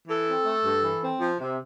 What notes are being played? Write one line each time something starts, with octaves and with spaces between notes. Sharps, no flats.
E3 A4
C4
A3
G2
E3
C4
F3
C3